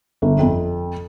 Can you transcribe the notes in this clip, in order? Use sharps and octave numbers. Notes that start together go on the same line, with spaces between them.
G1
F2